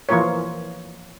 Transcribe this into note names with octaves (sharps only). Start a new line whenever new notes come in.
E3 F3 A#3 F4 A#4 C#5